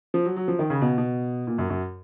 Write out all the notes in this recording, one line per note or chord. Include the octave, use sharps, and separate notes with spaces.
F3
F#3
F#3
F3
D#3
C#3
B2
B2
A#2
F#2
F#2